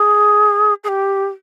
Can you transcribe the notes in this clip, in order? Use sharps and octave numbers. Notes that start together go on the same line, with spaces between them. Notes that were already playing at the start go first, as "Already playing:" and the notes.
Already playing: G#4
G#4
G4